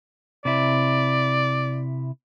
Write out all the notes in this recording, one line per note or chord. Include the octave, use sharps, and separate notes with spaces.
C3 E4 D5